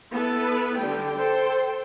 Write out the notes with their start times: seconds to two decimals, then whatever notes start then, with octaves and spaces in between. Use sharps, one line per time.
0.12 B3 E4 A4 B4
0.78 D3 G3 G5
1.16 A4 C5 G5